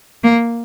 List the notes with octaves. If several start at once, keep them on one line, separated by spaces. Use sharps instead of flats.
A#3